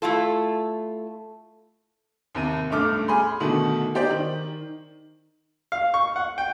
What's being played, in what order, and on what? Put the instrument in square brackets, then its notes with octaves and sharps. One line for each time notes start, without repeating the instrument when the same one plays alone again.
[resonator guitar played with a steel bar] A3 E4 F4 A4
[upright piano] D#2 C3 D#7
C#2 G2 A3 D6 F6
G#4 G#5 B5 C6
B2 D3 D#3 A3
D#4 G4 C5 D5 G5
D#3
[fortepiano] F5
C#6
F#5
G5